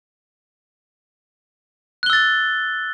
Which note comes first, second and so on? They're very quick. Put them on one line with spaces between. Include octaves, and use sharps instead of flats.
F#6 G7 E6 A6